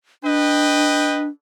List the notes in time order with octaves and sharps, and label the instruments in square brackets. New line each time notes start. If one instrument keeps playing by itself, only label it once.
[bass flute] D4 [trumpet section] B4 D#5 G5